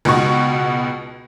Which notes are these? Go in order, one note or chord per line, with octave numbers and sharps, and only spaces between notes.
C#2 B2 D#4 F#4 C#6